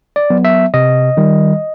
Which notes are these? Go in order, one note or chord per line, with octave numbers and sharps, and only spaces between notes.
D5
F#3 B3
E5
C3 D#5
D#3 G3